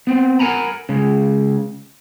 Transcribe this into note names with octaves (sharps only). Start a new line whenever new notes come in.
B3 C4
A#4 F#5 G#5 A#5 B5
C#3 G#3